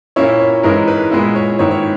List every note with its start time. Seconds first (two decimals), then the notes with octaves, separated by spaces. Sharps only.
0.16 A#2 A#3 C#4 E4 C#5
0.40 C#5
0.63 G#2 E3 G#3 C#4 E4 A#4
0.88 B4
1.12 A#2 G#3 B3 E4
1.36 C#5
1.59 G#2 D#3 A#3 E4 C#5
1.71 C#5